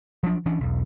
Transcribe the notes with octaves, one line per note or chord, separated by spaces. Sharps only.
F3 F#3 D4
E3 C#4 D4
B1 E2